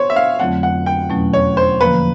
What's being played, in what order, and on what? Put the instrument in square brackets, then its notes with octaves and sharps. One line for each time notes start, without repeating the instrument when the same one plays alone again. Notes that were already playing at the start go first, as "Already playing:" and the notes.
Already playing: [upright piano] C5 C#5
E5
F5
[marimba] F2 D3 F#3 A3 C4 [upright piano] F#5
[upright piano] F#5
G5
[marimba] E2 B2 F#3 A3 C#4
[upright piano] C#5
C5
[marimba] D3 F3 A#3 [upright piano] B4